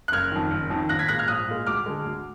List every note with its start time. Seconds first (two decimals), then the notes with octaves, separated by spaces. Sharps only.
0.08 F#6
0.12 F#1 F6 G#6
0.32 F2 D#3
0.51 F#1
0.70 F2 D#3
0.89 A#1 F#6 A#6
0.99 G#6 B6
1.08 A#2 G#3 F#6 A#6
1.18 F6 G#6
1.28 A#1 D#6 F#6
1.47 A#2 G#3
1.66 D2 D6 F6
1.86 D3 G#3
2.05 D2